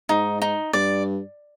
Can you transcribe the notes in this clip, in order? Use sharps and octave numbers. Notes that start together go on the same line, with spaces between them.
G#2 D#4
D#4
G2 D5